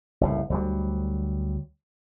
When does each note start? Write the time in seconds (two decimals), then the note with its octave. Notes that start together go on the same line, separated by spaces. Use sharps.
0.21 F#1 C2 A2
0.50 D2 F#3 G3